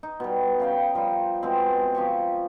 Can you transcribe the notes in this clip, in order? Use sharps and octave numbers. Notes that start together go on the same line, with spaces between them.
D#4
B2 G3
C#3 F5 G5
F3 G3 F4 C5
B2 G#3 C4
F3 G4 C#5